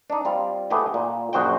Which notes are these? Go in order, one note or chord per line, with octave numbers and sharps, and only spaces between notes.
D4 D#4
G3 C4 F4
A3 B3 G4 G#4 D#5
A#2
A#1 F#2 F#4 C5 D#5 G5